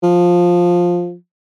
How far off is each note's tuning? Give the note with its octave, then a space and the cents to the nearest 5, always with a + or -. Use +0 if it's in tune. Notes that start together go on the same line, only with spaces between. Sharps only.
F3 +10